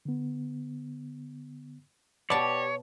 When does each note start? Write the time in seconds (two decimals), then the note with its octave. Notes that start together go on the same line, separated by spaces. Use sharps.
0.05 D3 B3
2.30 B2 G4 C#5 D5 A5